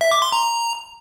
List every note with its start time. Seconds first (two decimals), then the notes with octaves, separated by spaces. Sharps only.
0.01 E5
0.11 D6
0.22 C6
0.32 A#5